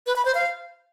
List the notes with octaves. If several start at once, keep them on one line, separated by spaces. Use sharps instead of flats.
B4
B5
C5
F5